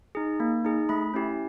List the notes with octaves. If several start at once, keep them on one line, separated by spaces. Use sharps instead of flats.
D#4 G#4
A#3
D#4 G#4
A3 B5
C#4 E4 G4